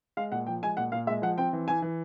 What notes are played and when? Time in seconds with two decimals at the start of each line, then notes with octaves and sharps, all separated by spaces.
0.17 G#3 F5
0.32 A#2 F#5
0.47 F3 G5
0.62 G#3 G#5
0.77 A#2 F#5
0.92 A#2 F5
1.07 G#3 E5
1.22 F3 F#5
1.38 C4 G5
1.53 E3
1.68 E3 G#5
1.82 E3